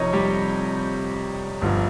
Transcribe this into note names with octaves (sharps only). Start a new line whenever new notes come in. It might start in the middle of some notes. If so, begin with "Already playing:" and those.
Already playing: F1 F2 C3 F3 D#4 C#5 D#5
G3 G4
G1 G2 F3